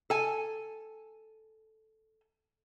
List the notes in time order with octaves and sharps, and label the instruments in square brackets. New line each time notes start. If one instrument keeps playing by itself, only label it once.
[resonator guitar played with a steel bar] A4 G#5